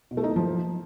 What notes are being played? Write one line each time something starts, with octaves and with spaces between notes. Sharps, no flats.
B2
A3
D#4
A#3
F3